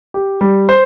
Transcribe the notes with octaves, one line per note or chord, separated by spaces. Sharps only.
G4
G3
C5